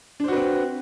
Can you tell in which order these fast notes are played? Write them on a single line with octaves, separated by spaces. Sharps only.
D4 C5 F#4 B4 C4